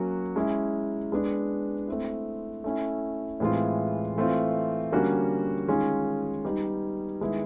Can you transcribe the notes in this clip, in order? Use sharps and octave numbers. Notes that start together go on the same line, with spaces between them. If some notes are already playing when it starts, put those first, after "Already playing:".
Already playing: F#3 A#3 C#4 F#4
G#3 C#4 E4
G#3 B3 D4
A3 C4 E4
A3 C#4 E4
A2 E3 G#3 C4 F4
E3 A3 C4 F4
D3 G3 A#3 C#4 F#4
D#3 G#3 C#4 F4 G#4
G3 B3 D#4
D#3 G#3 B3 E4